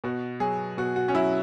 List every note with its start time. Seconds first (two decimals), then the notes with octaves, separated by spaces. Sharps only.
0.04 B2 F#4
0.40 F#3 G#4
0.77 B2 F#4
0.96 F#4
1.08 C#4
1.15 F#3 E4